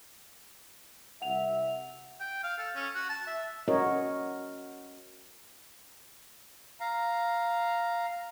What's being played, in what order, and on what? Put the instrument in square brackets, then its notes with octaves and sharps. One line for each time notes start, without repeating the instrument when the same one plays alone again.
[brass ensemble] C2 E5 [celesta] F#5 F7
[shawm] G5
F5
A4
C#4
F#4
A5
E5
[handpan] C#4 F#4 A#4 C#5 D#5
[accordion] F5 A#5